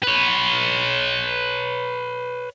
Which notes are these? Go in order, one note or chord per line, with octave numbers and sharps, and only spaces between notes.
B4 C#5